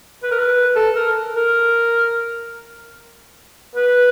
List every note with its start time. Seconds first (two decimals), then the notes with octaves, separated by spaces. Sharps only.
0.23 B4
0.31 A#4
0.39 B4
0.76 A4
0.96 A#4
1.36 A#4
3.76 B4